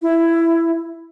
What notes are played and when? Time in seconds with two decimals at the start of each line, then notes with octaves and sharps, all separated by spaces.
0.02 E4